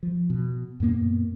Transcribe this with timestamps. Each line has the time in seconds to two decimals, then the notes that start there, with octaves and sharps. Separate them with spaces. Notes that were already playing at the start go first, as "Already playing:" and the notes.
0.03 F3
0.30 B2
0.80 F#2 A#2 A#3 B3